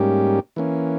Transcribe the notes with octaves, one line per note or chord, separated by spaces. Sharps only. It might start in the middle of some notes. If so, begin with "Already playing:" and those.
Already playing: G#2 G3 A#3 C#4 G4
E3 A#3 C#4